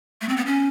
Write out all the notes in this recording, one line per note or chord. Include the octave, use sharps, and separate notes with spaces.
A3
C4
B3
C#4